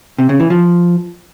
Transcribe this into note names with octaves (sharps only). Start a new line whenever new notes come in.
C3
C#3
E3
F3